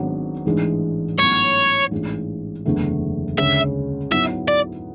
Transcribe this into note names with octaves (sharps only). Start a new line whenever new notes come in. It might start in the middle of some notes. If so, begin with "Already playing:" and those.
Already playing: G#1 G#2 F#3 B3 D4
A1 G#2 E3 G#3 D4
A1 G#2 F#3 B3 C#5
A1 G#2 G#3 D4
F#1 E2 D3 A3
D2 C#3 G#3 C#4 E5
G#2 F#3 B3 E4 E5
D5